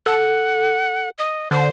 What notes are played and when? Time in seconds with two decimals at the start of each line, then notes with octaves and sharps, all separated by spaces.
0.06 A4 F#5
1.18 D#5
1.51 D3 C5